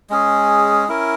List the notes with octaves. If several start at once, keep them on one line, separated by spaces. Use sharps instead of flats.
G#3 C#4 G#4
C#4 E4 A#4